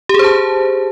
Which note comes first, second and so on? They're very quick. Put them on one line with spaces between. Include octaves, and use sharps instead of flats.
G4 G#4 C5 A5